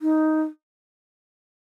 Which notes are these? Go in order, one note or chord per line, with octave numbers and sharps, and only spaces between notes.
D#4